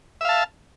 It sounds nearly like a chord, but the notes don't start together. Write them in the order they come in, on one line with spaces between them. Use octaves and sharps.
E5 F5 A5